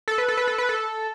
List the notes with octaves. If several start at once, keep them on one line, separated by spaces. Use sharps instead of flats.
A4
B4
A4
B4
A4
B4
A4